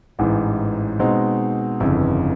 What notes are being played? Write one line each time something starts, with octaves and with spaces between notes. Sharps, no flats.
A1 G#2 E3
B2 G#3 C4 D#4
G1 F2 C#3 E3